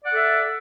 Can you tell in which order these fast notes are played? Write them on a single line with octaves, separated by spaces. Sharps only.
D5 F#5 A4 E5